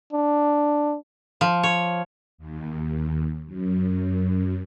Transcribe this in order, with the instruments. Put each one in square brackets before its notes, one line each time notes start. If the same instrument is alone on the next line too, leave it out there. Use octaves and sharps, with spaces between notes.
[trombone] D4
[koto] F3
C#5
[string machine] D#2
F#2